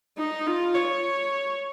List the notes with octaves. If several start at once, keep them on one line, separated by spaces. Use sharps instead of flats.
D#4
F4
C#5